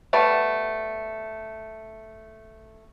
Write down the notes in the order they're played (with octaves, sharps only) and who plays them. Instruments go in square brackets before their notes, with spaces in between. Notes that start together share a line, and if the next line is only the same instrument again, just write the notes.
[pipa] G3 A3 B3